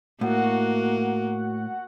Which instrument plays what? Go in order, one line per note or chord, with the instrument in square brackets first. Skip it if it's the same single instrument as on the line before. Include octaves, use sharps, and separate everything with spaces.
[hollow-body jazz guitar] A2 [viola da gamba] A#3 [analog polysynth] F#4 F#5